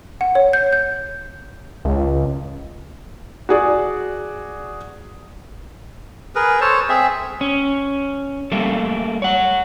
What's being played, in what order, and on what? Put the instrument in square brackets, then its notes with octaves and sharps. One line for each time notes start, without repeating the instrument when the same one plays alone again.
[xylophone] F#5
C#5
G6
G6
[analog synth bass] C#2
[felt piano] F#4 G#4 D5
[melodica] G#4 A#4 B4
A4 C5 C#5 A5
C4 G#4 E5
[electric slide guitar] C#4
G3 A3 A#3 A4
C#5 F#5